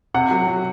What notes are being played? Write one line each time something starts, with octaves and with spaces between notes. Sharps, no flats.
C3 F#5
F#3
F#3